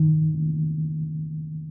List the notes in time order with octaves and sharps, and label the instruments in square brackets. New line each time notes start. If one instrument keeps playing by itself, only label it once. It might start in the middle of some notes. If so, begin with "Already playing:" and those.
Already playing: [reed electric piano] D#3